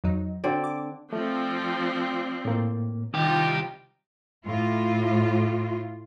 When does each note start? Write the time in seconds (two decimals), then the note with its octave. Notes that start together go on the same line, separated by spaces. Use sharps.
0.04 F2 F#3 D#4
0.44 D3 C4 F#4 D5
0.64 D6
1.13 F3 A3 C4 D5
2.45 A2 A#3
3.14 C2 D#3 D#4 F4 G4 A#5
4.44 A2 F4